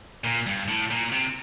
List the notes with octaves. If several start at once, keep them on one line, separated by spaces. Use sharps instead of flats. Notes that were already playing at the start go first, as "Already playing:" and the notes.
A#2
G2
A2
A#2
C3